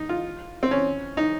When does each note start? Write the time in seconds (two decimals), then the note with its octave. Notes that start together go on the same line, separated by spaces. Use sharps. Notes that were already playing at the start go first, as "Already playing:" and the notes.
Already playing: D#4
0.09 F4
0.63 C4
0.71 C#4
1.17 D#4